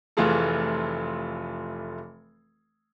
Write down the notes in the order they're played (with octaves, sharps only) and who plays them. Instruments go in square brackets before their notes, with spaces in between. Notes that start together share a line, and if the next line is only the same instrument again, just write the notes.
[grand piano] F1 E3 A3 F4 G#4 A4